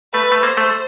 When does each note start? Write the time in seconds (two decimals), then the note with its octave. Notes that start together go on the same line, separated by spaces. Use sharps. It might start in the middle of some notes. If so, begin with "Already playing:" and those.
0.14 A3 B4
0.32 A3
0.43 A#3 C5
0.57 A3